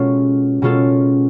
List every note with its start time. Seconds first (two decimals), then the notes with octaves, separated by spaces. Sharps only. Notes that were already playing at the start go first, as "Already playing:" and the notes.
Already playing: B2 G#3 C#4 F4 A4
0.62 B2 G#3 C#4 F4 A4